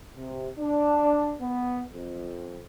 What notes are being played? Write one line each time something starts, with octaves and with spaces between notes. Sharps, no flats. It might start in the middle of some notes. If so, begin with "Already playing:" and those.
C3
D4
B3
F2